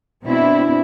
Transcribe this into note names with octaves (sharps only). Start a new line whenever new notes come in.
B2 C4 D4 E4